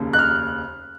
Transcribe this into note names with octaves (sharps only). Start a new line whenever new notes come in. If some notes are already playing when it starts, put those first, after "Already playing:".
Already playing: F1 D#2 C#3
F#6
F6